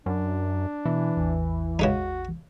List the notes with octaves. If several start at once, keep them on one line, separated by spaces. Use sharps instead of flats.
F#2 D4
B2 E3
A1 E2
C#3 G#3 D#4 F#4